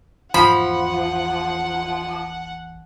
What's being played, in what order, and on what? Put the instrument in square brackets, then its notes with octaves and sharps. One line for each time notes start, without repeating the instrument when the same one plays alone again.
[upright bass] G#1 E2 [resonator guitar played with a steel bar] F3 [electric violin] F#5 [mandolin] B5